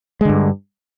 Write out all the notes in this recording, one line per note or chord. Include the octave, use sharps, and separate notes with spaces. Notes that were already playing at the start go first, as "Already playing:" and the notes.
G2 D3 G#3